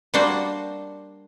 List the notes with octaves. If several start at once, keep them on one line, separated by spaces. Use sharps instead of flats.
G3 A#3 D4 F#4 C5